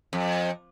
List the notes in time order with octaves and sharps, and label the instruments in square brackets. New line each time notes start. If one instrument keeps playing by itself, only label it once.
[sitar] F2